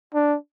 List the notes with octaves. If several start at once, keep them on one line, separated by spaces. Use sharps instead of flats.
D4